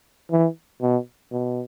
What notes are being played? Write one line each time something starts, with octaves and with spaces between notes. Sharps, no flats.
E3
B2
B2